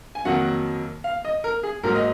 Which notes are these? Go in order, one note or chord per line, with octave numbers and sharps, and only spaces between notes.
G#5
F2 D#3 F#3 A#3 F#5
F5
D#5
A#4
G#4
G#2 F#3 A#3 A#4
D#5